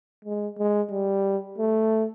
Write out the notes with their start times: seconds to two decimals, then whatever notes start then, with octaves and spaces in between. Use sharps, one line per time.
0.25 G#3
0.58 G#3
0.91 G3
1.58 A3